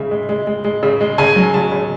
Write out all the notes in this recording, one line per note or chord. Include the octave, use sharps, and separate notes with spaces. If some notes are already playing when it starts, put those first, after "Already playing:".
Already playing: C#3 G#3 E5
G#3
G#3
G#3
G#3
C#3
G#3
C#3 G#5
F#3
C#3 A5
C#3